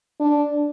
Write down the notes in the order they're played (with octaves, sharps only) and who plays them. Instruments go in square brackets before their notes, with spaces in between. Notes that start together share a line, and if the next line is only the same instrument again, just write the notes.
[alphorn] D4